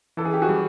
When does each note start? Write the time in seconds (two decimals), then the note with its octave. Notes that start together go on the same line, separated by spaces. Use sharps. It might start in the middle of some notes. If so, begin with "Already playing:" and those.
0.17 E3 A4
0.25 G#4
0.34 G4
0.42 F#4 G#4
0.49 G3